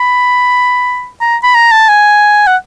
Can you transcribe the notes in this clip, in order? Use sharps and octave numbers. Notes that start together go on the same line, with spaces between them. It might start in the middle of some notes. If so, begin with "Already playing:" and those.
Already playing: B5
A#5
B5
A#5
A5
G#5
F#5